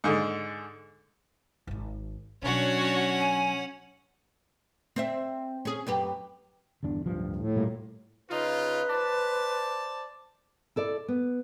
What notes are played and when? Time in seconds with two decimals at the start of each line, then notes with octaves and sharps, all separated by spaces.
0.04 G#2 D3
1.67 D1 G#1
2.42 B2 F#3 C#4 D4 F#4 C#5 F#5
3.20 G#5
4.96 C4 C5 E5
5.65 C#4 G#4
5.87 F#2 G4 B4
6.83 G1 E2 D4
7.06 D1 G2 F3
7.36 A2
7.56 A#2 G3 A#3
8.30 C#3 D#4 F4 B4
8.88 C5 D5 A5
10.76 E4 A4 D5
11.08 B3